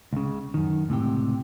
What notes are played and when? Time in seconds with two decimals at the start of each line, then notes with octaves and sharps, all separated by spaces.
0.13 C#2 C#3
0.54 F#2 D#3
0.89 C#2 A2 C3 G4